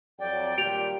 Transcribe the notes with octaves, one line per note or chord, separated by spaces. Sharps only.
F2 F#3 D5 G5
A#2 D#3 G3 G4 D7 F7